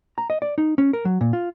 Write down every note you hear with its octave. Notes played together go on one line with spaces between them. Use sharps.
A#5
D#5
D5
D#4
C#4
A#4
F#3
A#2
F4